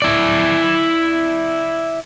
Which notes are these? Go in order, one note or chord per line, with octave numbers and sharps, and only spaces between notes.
E4 D5